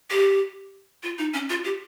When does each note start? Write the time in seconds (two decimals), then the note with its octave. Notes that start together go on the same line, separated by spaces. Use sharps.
0.11 G4
1.03 F4
1.18 D#4
1.34 C#4
1.49 F4
1.65 G4